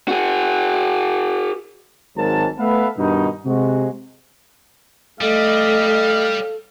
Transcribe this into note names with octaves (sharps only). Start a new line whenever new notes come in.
F#4 G#4
G#1 G#2 F#3 A#4 A5
A3 B3 A4 B4 E5 F5
G2 B2 D#3 D#4
C3 G#3 F#4
G3 A3 A4 D#5 F5